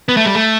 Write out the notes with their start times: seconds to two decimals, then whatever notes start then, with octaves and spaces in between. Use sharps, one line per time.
0.08 B3
0.17 A3
0.26 G3
0.35 A3